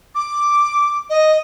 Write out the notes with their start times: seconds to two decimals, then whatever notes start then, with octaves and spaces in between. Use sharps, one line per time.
0.15 D6
1.10 D#5